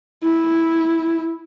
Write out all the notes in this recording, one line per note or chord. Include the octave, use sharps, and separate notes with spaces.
E4